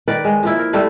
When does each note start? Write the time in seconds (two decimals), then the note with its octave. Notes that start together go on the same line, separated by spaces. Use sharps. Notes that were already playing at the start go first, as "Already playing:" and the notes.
0.08 D#3 B4 D5
0.25 G#3
0.43 F3 A#3 E4
0.59 A#4
0.73 G3 A3 C4 B4